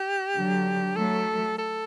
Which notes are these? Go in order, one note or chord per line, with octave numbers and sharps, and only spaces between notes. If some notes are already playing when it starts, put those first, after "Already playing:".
Already playing: G4
D3 F#3
F#3 A3 A4
A4